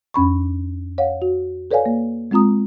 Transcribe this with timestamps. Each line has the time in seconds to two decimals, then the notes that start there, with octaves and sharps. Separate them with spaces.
0.14 F2 C#4 B5 C#6
0.98 C#5 F5 F#5
1.22 F#4
1.71 A4 B4 C#5 D5 F5 G#5
1.86 A#3
2.31 G#3 C4 F4 A#5 D#6